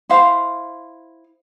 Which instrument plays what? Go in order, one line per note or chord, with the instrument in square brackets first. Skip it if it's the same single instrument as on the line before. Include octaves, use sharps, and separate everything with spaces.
[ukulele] E4 C5 F5